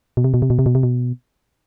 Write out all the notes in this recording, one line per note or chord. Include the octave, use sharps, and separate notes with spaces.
B2
C3
B2
C3
B2
C3
B2
C3
B2